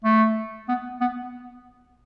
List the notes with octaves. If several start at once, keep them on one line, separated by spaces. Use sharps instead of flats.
A3
B3
B3